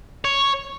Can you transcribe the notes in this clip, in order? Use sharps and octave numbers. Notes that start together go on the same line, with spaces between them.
C#5